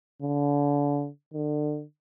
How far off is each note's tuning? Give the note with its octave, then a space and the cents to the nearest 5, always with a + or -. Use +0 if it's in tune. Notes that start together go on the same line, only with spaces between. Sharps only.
D3 -35
D3 +30